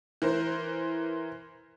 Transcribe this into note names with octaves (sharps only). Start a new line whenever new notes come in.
E3 A#4 C5